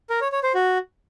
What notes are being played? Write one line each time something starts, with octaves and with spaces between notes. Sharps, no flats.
A#4
C#5
C#5
C5
F#4